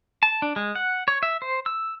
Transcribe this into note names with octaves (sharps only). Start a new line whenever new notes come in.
A5
D4
G#3
F#5
C#5
E5
C5
E6